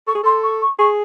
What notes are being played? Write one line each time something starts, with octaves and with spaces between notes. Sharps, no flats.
A4 C#6
G#4
A4 C6
C#6
C#6
G#4 C#6